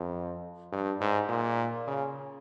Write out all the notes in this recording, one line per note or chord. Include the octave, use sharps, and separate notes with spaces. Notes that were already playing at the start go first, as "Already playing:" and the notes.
Already playing: F2
G2
G#2
A#2
C#3